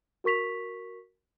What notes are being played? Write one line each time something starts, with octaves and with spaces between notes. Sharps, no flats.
F#4 A#4 C#6 B6 F7